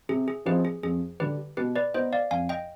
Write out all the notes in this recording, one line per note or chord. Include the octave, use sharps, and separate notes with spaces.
C3 G#4
G#4
F3 C4 D#4 G4 G#4 B4
G#4
F2 G#4
D3 G3 G4 B4
B2 G4 B4
B4 D5
B3 D#4 C5 D#5
D5 F5
F2 F5 G#5
D#5 G5